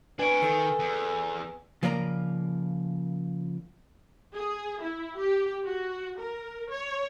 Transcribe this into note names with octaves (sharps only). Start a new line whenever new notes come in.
D4 B4 C#5 G#5 D7
D#3 A4
E2
C#3 F3 A#3 D5 E5 A#5
G#4
E4
G4
F#4
A#4
C#5